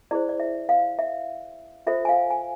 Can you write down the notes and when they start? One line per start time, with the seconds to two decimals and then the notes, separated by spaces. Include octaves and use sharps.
0.11 E4 G#4 C5 D5
0.29 D5
0.40 E5
0.69 F5
0.99 E5
1.87 F4 A4 C5 E5
2.05 G#5
2.09 F5
2.31 G#5